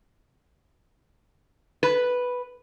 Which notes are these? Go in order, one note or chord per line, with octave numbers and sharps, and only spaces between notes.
B4